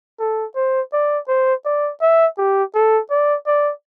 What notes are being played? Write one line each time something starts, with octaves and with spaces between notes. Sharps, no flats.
A4
C5
D5
C5
D5
E5
G4
A4
D5
D5